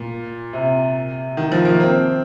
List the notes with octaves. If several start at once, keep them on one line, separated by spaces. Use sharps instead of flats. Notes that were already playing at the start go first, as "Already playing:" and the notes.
Already playing: A#2
C3
D#3
F3
A#3
C4